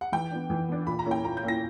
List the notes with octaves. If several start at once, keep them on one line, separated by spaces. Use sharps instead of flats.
F#5
E3 G5
B3 D4
E3
B3 D4
A#2 B5
A#5
A#3 C#4 E4
G5
A#2 A#5
G6
A#3 C#4 E4 A#6